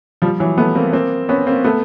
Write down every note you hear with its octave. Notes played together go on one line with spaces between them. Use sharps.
F3 G3
E3 F#3
A3 B3
A#3 C4
A#3 C4
B3 C#4
A#3 C4
A3 B3